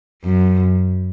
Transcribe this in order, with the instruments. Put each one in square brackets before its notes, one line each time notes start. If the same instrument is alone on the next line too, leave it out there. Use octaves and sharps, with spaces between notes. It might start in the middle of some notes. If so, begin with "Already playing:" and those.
[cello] F#2